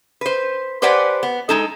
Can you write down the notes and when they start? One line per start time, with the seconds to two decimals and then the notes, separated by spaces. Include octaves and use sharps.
0.21 B4 C5
0.82 G4 B4 C5 D5 F#5 G#5
1.23 B3
1.49 G#3 D#4 A4